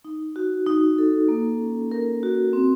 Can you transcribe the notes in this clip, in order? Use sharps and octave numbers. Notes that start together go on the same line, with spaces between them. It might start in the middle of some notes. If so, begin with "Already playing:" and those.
D#4
F#4
D#4
A4
A#3
C#4
A#4
F#4
C4